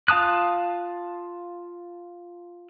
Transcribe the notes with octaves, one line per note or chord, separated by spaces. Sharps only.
F4 F5 A5 D#6 F#6